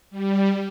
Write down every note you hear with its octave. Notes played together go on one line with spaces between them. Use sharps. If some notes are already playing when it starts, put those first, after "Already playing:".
G3